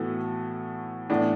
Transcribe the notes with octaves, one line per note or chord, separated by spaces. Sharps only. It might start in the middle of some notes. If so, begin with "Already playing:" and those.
Already playing: A2 E3 B3 F#4 A4
A2 E3 B3 D4